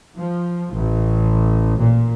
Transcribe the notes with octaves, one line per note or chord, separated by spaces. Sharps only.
F3
A1
A#2